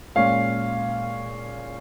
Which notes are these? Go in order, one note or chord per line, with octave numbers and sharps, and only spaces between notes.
A#2 G#3 C#4 F5